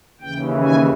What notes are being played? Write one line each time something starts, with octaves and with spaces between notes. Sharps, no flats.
D#2 C#3 E3 G5
G#5